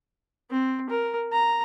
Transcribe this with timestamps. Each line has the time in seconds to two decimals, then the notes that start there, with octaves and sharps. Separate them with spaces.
0.51 C4
0.89 A#4
1.32 A#5